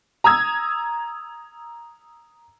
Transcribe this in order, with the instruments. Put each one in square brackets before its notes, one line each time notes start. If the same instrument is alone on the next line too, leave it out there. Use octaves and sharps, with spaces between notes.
[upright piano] A#5 D#6 E6 G#6